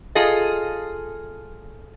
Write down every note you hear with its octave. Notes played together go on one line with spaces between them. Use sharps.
F4 G#4 A4 D#5